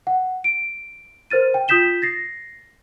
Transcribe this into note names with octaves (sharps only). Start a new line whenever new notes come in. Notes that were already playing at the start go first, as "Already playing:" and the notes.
F#5
D7
A#4 C5 F6 A6 D#7
G5
F4 D#6 G6 B6 E7 G7
A6 A#6 C7